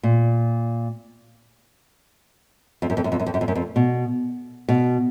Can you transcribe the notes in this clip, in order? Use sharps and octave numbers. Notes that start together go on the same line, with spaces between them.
A#2
F2
F#2
F2
F#2
F2
F#2
F2
F#2
F2
F#2
F2
B2
B2